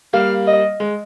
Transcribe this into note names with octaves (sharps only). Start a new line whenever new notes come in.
G3 A#3 F5
D#5
G#3